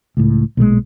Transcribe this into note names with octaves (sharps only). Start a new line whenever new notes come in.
C#2 A2
B1 A#2 F#3 G#3